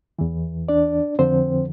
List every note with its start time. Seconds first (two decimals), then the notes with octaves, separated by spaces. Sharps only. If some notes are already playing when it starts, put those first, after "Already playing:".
0.19 E2 E3
0.68 D4 D5
1.19 F2 D3 F3 C4 C5